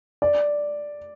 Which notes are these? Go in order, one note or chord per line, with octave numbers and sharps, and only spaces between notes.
D5